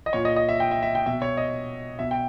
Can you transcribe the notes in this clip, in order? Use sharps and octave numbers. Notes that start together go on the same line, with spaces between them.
D#5
A#2 C#5
D#5
D#5
E5
G5
E5
E5
G5
B2 E5
C#5
D#5
B2 E5
G5